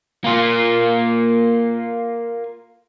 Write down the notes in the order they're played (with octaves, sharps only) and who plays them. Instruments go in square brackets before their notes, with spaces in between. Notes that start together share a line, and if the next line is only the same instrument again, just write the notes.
[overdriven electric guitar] A#3 F4